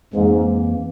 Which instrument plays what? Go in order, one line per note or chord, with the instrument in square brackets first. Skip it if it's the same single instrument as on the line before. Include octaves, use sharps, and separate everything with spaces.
[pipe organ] F2 E3 A#3 [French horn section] G#2